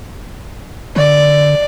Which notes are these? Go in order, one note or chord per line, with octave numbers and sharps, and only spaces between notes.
D3 D5